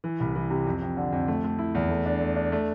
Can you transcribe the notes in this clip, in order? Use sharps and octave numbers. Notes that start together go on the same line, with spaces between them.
E3
C2
E3
C3
F2
F2
D3
F2
A3
A3
E4
E2
A3
D4
A3
D4
A3